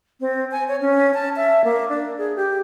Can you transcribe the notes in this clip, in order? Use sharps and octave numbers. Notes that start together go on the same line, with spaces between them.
C4
G#5
C#5
C#4
A5
E5
A#3
D4
G#4
G4